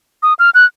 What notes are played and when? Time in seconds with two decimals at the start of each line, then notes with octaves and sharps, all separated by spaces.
0.23 D#6
0.39 F6
0.55 F#6